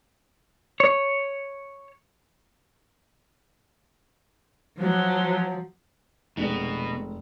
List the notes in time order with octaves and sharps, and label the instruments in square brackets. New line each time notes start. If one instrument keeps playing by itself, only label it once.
[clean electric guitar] C#5
[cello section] F3 [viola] F#3
[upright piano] F1 G#3 [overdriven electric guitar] B2